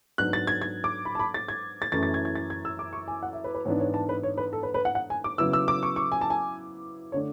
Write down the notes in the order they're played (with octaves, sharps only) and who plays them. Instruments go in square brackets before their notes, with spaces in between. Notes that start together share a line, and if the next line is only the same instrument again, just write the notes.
[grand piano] G#2 F#3 B3 D4 [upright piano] F#6
[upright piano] A6
G#6
G#6
D6
B5
A5
B5
A6
G#6
A6
[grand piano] F#2 E3 A3 C#4 E4 [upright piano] A6
[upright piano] A6
G#6
G#6
A6
G#6
E6
D6
C#6
G#5
F#5
E5
B4
B4
[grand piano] G#2 E3 B3 D4 [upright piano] C#5
[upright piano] C#5
A5
B4
C#5
B4
A4
B4
B4
F#5
F#5
G#5
D6
[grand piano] C#3 F#3 B3 E4 [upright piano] E6
[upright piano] E6
D6
C#6
C#6
G#5
A5
G#5
[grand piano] D3 A3 D4 [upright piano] C#5